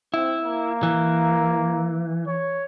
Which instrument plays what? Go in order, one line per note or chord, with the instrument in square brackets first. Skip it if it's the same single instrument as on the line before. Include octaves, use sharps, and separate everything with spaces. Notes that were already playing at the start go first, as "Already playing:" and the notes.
[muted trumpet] C4 [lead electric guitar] E4
[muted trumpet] A#3
[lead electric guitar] E3
[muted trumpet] C#5